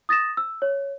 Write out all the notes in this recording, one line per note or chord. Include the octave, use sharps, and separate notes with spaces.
D#6 A6 A#6 E7
E6
C#5